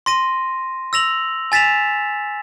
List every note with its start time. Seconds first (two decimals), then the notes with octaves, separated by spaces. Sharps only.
0.06 C6 A#6 D#7
0.93 E6 A#6 F7 F#7
1.52 G#5 A6 B6 E7 F7